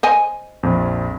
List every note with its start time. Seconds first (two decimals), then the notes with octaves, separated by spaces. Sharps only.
0.03 C5 D#5 G#5
0.63 A#1 F2